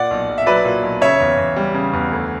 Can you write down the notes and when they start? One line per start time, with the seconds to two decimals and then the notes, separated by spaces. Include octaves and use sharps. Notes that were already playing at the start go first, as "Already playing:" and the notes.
Already playing: A#2 D5 F#5
0.11 B1
0.29 B1
0.38 E5
0.46 F#3 B4 D5
0.65 A#2
0.83 B1
1.01 C#3 C#5 E5
1.20 E2
1.37 E2
1.56 G3
1.74 C#3
1.93 E2
2.12 D2